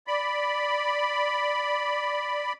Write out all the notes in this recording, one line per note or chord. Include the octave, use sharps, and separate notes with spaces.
D5 B5